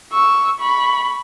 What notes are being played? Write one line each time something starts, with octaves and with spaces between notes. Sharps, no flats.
C#6 E6
B5 C#6